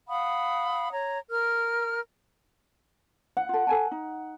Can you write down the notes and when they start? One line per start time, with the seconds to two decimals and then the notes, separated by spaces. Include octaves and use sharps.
0.09 F5 F#5 B5 D#6
0.92 C#5 A#5
1.30 A#4 F6
3.37 F#5
3.49 F4 A4
3.67 A4 G#5 A5
3.91 D#4